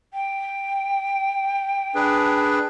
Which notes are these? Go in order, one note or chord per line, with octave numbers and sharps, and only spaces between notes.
G5
D4 G#4 B4